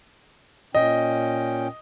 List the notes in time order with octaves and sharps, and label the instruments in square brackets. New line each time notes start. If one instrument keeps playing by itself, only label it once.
[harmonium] A#2 C#4 G5 [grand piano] D#5